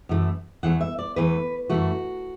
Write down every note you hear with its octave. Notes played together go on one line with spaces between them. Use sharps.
F#2 E3 A3
E2 E3 A3 F#5
E5
D5
E2 E3 A3 B4
F#2 E3 A3 F#4